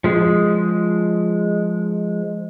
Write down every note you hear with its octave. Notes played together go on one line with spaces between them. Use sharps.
F3 G#3